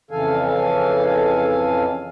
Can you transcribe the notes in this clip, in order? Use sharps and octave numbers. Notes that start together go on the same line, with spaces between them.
F2 C#3 E3 A4 F5 G#5